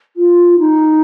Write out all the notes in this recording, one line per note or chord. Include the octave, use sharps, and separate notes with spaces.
F4
D#4